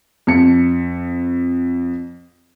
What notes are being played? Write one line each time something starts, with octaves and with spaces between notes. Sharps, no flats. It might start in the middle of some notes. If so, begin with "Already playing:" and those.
F2 C#7